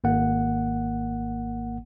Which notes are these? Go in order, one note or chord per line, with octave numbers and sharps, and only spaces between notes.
G#1 A#3 F#5